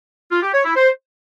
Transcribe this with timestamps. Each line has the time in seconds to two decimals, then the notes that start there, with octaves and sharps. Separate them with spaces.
0.32 F4
0.43 G4
0.54 C#5
0.65 E4
0.76 C5